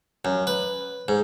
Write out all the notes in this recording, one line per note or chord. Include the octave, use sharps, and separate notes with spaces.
F#2
B4
G#2